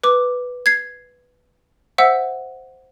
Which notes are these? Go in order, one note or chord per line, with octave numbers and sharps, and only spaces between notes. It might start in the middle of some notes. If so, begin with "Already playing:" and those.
B4 D6
G#6 C7
C5 E5 F#5 E6